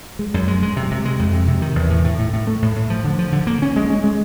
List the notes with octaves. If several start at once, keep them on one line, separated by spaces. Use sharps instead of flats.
G#3
F#2
G#3
G#3
C3
C3
G#3
F2
C3
C3
D#3
E2
A2
A2
A2
A2
A3
A2
A2
F3
D3
F3
D3
A#3
C#4
G#3
C#4
G#3